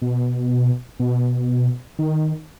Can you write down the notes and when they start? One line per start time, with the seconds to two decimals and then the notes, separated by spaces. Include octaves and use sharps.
0.02 B2
1.00 B2
1.99 D#3